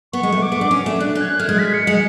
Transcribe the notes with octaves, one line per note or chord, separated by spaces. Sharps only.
B3 C#6
G#3
A3
D6
B3
D4
C#4
A3
D4 F#6
C#4
G#6
F#6
A3 F6
G#3 G#6
B6
C#7
G#3 C#7